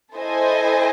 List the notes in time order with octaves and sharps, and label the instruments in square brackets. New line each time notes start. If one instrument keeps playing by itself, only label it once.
[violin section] E4 A4 C5 D#5 G#5